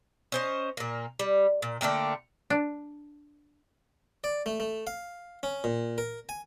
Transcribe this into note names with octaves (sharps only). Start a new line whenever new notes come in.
C#4 C5 D#5
A#2 A#3
G3
A#2
D3 A3 A#3 G5
D4
D5
A3
A3
F5
C#4
A#2
A#4
G#5